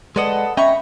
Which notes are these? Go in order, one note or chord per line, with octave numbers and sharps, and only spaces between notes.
G#3 A4 B4 D5 D#5 F#5
C#4 D#5 E5 G5 A#5 B5 C#6